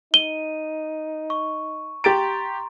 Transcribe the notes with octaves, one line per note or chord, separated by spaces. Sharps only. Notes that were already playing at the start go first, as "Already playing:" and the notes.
D#4 D#7 G7
C#6
G4 A#5 C6 A6 D7